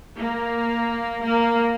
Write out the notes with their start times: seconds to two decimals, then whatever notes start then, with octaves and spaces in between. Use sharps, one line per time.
0.16 A#3
1.24 A#3